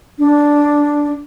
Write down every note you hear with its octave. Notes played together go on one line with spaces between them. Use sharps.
D4